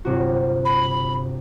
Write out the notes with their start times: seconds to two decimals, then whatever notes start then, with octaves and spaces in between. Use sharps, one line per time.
0.05 G1 C3 F#4
0.65 B5